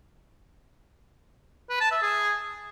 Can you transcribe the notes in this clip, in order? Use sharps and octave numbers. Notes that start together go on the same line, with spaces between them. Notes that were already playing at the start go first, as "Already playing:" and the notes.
B4
A5
E5
G#4